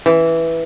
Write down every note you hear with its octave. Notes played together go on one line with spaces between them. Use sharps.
E3